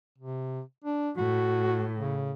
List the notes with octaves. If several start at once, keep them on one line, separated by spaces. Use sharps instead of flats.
C3
D4
A2 F#4
C#3